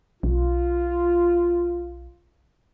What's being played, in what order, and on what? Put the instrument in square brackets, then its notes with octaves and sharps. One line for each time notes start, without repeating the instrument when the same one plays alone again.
[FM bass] B1 [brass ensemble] F4